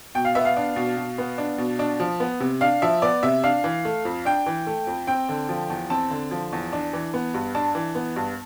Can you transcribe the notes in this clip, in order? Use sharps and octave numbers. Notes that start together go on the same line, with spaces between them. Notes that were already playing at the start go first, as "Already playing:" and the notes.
B2 G5
F5
B3 E5
F5
D4
B2
B2
B3
D4
B2
D4
F3
B3
C3
D4 F5
F3 E5
B3 D5
C3 E5
D4 F5
E3
A3
F2
D4 G5
E3
A3
F2
C4 G5
D3
F3
E2
C4 A5
D3
F3
E2
D4
E3
B3
G2
D4 A5
E3
B3
G2